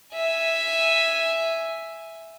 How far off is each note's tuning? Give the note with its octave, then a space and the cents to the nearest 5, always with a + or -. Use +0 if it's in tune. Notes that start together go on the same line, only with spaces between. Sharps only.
E5 +0 G#5 +0